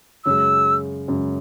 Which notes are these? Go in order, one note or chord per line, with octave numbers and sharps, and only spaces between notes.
F#2 C#3 G#3 E6
F#2 C#3 G#3